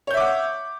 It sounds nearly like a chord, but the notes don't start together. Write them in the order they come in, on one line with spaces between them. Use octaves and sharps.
C#5 G6 E5 D6 F#5